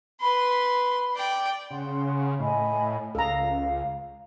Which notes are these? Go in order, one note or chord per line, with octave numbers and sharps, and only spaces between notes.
B4 B5 C6
D5 G5
C#3 F#5 C6
A2 D#5 G#5 B5
C#2 A4 F5 A#5